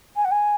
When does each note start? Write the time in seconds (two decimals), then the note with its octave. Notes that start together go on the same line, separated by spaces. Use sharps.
0.16 G#5
0.25 F#5
0.31 G#5